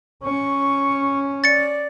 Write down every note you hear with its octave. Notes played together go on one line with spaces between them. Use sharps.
C#4 C#6
D5 A6 C#7